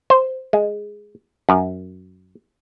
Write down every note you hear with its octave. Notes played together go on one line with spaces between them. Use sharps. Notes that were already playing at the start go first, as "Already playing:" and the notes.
C5
G#3
F#2